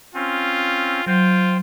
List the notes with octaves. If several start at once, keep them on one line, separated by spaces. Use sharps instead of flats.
C4 C#4 F4
F#3 F4 C5 G5